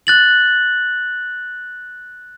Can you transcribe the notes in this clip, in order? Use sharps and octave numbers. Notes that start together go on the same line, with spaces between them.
F#6 A6 F#7